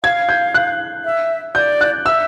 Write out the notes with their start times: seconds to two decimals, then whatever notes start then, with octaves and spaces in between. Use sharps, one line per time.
0.04 F5 G#6
0.29 G6
0.54 F#6
1.05 E5
1.55 D5 G6
1.81 F#6
2.05 E5 E6